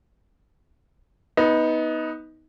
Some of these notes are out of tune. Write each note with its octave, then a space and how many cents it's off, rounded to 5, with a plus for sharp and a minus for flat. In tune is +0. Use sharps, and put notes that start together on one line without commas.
B3 +0 D#4 +20